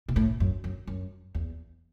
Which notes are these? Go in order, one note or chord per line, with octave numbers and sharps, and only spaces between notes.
B2
A2
F#2
F#2
F#2
E2